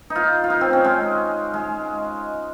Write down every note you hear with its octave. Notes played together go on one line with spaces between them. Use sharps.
D#4
F4
F4
D#4
C4
C#4
G#3
G#3